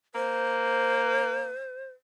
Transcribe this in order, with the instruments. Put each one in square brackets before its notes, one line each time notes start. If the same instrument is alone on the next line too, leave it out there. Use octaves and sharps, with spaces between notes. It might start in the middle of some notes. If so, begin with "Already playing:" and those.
[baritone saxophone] A#3 [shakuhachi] C5